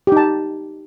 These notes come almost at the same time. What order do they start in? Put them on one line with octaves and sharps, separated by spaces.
G4 D#4 A5